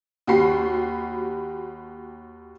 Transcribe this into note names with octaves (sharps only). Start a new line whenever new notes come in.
D#2 F#4 G4 B5 C7